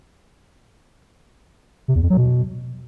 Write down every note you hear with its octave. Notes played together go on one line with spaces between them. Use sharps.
C3
E2
F2
F#3
B2